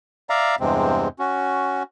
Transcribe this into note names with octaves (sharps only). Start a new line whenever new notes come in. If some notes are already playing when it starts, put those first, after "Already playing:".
D5 E5 F5 A#5
E2 G2 C3 G#3 C4
C#4 F#4